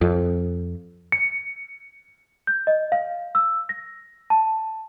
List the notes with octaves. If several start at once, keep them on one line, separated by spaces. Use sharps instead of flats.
F2
C#7
G6
D#5
F5
E6
A#6
A5